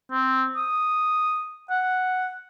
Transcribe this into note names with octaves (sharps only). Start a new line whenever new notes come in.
C4
D#6
F#5